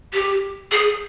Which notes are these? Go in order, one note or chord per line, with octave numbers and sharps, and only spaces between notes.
G4
G#4